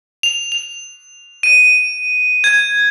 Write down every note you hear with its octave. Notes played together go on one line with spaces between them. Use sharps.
F7
F7
D#7
G#6